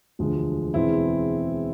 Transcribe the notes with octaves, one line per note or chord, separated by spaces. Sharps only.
E1 D2 D3 F3 G#3
E2 B2 G#3 C4 E4